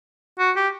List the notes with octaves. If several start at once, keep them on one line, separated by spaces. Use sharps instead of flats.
F#4
G4